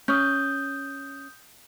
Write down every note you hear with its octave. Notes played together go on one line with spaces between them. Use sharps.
C#4 D#6 G6